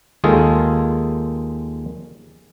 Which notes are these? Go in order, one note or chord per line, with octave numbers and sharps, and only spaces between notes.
D#2 D#3 G#3 F4 G#4 A4